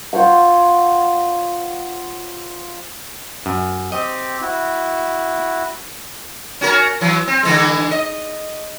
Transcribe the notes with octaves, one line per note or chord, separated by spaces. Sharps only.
F4 C5 C#5 F#5
F#2
C4 G4 D#5
E4 F#4
C#4 F#4 A#4
E3 F#3
C4
D3 E3 G#3
D#5